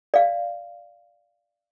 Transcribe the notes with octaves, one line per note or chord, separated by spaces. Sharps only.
D5 F5